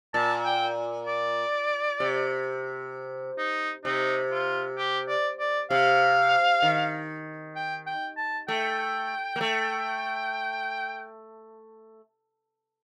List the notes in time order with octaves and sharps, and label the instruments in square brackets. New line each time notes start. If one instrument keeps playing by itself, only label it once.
[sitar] A#2 [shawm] A5
[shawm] G5
D5
[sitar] C3
[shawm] D#4
[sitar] C3 [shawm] D#4
[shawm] F4
G4
D5
D5
[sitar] C3 [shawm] F5
[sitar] D#3
[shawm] G5
G5
A5
[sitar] A3 [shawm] G5
[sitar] A#3
A3